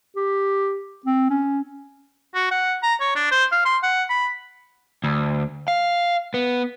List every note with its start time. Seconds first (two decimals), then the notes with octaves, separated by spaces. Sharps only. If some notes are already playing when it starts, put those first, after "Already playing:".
0.16 G4
1.06 C4
1.30 C#4
2.35 F#4
2.51 F#5
2.83 A#5
3.01 C#5
3.16 D4
3.32 C5
3.52 F5
3.65 C6
3.83 F#5
4.10 B5
5.04 D2
5.68 F5
6.34 B3